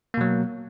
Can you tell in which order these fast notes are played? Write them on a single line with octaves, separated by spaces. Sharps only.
A#3 B2 F#3